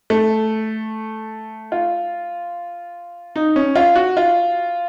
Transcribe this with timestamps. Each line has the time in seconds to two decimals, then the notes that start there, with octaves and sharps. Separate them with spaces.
0.10 A3
1.72 F4
3.36 D#4
3.56 C#4
3.76 F4
3.95 F#4
4.17 F4